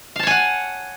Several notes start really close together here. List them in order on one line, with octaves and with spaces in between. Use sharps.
F5 A5 C#5 G#5 F#5